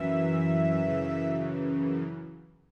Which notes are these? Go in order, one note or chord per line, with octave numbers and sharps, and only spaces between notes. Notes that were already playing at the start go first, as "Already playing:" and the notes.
Already playing: F#2 E3 E5
F#2 C#3 E3